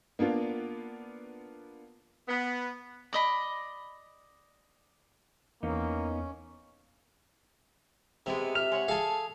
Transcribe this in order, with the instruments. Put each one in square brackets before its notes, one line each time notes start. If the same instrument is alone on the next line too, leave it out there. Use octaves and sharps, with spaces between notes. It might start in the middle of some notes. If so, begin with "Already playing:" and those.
[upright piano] A#3 B3 D4 F4
[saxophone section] B3
[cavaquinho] D5 D#5 B5
[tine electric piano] E2 [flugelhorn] A#3 [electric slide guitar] B3 D#4 [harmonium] C#4
[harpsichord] C3 [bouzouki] G#3 B3 E4
[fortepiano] E5 F6 [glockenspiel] F7
[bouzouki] G#3 C#5 F#5
[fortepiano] G#4 [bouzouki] A4 A5 [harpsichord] F5 G#5